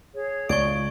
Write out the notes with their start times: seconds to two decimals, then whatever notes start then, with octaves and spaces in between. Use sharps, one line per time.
0.14 G#4 C#5
0.49 C#2 D5 C#6 G#6 D7